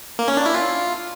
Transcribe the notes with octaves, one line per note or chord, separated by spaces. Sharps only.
A#3
C#4
D4
E4
F4